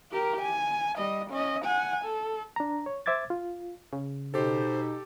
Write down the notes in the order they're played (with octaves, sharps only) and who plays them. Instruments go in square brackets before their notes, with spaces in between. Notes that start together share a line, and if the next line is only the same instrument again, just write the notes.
[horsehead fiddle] G4 A#4
G#5
G3 D#5
C#4 D#5
F#5 G#5
A4
[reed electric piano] D4 A#5
C#5
C5 E5 D6 G#6 A6
F4
[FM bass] C#3
[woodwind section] B2 D#4 [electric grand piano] G4 A4 [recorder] C5